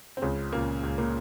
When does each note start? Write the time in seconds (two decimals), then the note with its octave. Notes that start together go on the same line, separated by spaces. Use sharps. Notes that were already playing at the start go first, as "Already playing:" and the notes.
0.17 C4
0.22 C#2 C#3 C#4
0.53 C#2 A#2 A#3
0.83 C#2
0.98 A#2 A#3